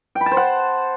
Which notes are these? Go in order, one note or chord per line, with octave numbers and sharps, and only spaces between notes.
G5
B5
A5
C5
F#5